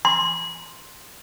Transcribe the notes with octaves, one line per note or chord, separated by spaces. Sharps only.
C6